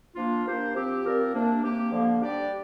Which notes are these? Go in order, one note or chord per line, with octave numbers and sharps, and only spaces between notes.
F3 A#3 D4 F4
A#3 D4 G4 C5
F3 C4 G4
F3 C4 A#4 D5
C3 A#3 D4
C3 A#3 G4
D3 F3 A#3
G3 D4 G4 D5